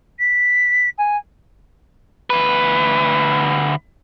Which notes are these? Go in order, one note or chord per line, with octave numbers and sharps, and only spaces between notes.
B6
G#5
D2 B4